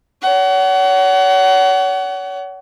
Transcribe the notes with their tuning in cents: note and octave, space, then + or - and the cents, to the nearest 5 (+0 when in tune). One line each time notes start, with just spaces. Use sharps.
C#5 +35 F#5 +30